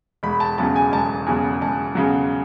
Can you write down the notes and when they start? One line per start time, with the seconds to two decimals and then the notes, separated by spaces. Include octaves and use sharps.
0.23 E1 B5
0.40 A5
0.57 E2 C#3 F#3 A5
0.76 G#5
0.92 E1 A5
1.26 E2 C#3 F#3 G#5
1.61 E1 A5
1.95 E2 C#3 F#3